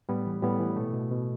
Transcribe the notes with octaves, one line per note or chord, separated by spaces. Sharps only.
A2 G3 B3
E3
A2 G3 B3
E3
B2 A3
B2
B2